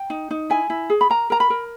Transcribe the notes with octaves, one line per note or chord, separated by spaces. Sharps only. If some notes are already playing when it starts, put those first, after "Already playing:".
Already playing: G5
D#4
D#4
E4 G#5
E4
G#4
B5
A#4 A#5
A#4 A#5
B5
A#4